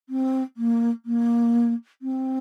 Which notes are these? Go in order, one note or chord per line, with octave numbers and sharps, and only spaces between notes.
C4
A#3
A#3
C4